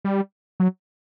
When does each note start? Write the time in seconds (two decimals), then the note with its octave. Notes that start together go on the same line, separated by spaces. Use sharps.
0.05 G3
0.60 F#3